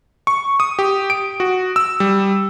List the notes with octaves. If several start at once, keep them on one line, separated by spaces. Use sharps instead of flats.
C#6
D#6
G4
D7
F#4
E6
G3